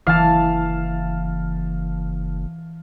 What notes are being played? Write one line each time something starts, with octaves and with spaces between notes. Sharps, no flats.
F#1 E3 F5 A5